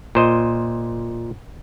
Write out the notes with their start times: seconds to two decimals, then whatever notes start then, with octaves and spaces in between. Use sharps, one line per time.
0.15 A#2 C5 D#5